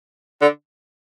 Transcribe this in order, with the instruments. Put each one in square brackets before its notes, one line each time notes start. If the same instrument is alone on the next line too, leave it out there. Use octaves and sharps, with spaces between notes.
[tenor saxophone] D3